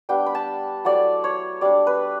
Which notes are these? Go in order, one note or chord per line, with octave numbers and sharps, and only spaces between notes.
G3 B3 D4 G5
B5
A5
F#3 A3 E4 D5
C#5
G3 D4 D5
B4